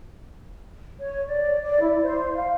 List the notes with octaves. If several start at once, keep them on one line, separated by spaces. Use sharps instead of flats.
C#5
D5
D5
E4
C5
F5